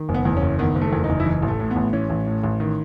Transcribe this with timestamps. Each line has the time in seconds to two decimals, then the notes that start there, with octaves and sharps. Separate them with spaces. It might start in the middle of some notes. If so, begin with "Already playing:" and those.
Already playing: D#3
0.09 F#1
0.14 B3
0.25 E2
0.37 C#4
0.42 F#1
0.59 D#3 B3
0.76 F#1
0.82 A3
0.93 E2
1.04 D#4
1.10 F#1
1.20 E4
1.26 E3 D#4
1.42 A1
1.48 A3
1.60 A2
1.71 B3
1.76 A1
1.93 E3 C#4
2.10 A1
2.27 A2
2.43 A1
2.60 D#3